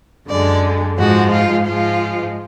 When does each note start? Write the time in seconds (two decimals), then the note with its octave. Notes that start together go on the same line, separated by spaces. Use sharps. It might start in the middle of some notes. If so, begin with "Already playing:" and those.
0.28 F#2 D3 G#3 D5
0.98 G#2 F3 G#3 F#4
1.32 F4
1.66 G#2 F3 G#3 F4